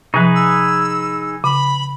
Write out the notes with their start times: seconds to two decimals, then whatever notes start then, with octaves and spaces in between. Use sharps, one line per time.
0.14 C3 F3 D#4 G#4 B4
0.35 E6
1.44 C#3 B5